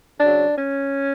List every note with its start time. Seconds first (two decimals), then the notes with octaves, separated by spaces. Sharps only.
0.20 C#3 F#3 D4
0.57 C#4